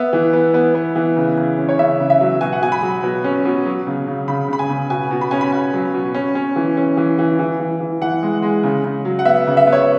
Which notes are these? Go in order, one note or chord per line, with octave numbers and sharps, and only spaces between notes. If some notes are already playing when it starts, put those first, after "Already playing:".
Already playing: B3 E5
E3
B3
B3
B3
E3
C#3
C#3
C#4
C#5
C#3 E5
C#3
E5
F#3
B2 G#5
F#5
B2 G#5
B5
F#3
B2
C#4
B2
F#3
C#3
C#3
C#3 B5
C#3 B5
G#5
C#3
B2 G#5
B2
B5
C#4 G#5
B5
B2 G#5
F#3
B2
C#4
C#4
E3
C#4
E3
E3
E3
E3
E3
E3 F#5
G#3
G#3
C#3
C#3
F#3
F#5
B3 E5
C#3
E5
B3
C#5